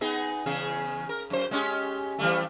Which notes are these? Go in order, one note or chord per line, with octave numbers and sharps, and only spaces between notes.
B3 D#4 G#4
E2 C#3 G#4
A#4
F#2 C5
G#3 C#4 G4
E3 G3 A3